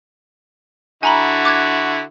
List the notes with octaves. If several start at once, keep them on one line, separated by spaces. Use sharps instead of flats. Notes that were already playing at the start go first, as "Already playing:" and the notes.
D3 E4 F#4 G#5 A#5 B5
D6 F#6 G#6